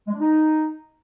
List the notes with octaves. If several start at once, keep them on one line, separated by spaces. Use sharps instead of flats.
G#3
D4
D#4